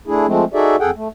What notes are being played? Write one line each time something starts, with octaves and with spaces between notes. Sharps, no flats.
A3 D4 E4 G#4
F3 G#3 A3 C4
D#4 F#4 G#4 A4 D5 E5
F2 G#4 A4 F#5 G5
A3